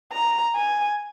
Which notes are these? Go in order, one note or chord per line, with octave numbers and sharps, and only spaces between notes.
A#5
G#5